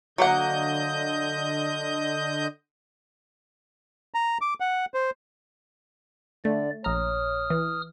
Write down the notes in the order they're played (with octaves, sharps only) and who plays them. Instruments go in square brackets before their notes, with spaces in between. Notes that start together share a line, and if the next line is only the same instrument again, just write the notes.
[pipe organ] D3 D#5 G6 [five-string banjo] F#3 A#3 F#5
[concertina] A#5
D6
F#5
C5
[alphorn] D3 [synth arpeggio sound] A3 [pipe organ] D5
[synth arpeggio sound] A#1 A#5 [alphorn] C#5 [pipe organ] D#6 F6
[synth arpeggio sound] E3